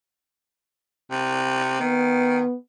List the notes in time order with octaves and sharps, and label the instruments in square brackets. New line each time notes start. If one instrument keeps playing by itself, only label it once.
[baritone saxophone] C3
[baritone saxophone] D#3 [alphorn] B3